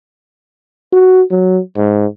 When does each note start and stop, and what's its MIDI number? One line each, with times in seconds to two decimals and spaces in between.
0.93 1.22 66
1.31 1.60 54
1.77 2.06 44